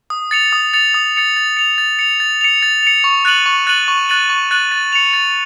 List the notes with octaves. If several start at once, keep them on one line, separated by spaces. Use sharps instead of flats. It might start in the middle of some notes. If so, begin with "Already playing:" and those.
D#6
A6 C#7 F7
D#6
A6 C#7 F7
D#6
A6 C#7 F7
A6
C#7 F7
A6
C#7 F7
A6
C#7 F7
A6
C#7 F7
C#6
F#6 A6 D#7 F#7
C#6
F#6 A6 D#7 F#7
C#6
F#6 A6 D#7 F#7
C#6
F#6 A6 D#7 F#7
A6
C#7 F7
A6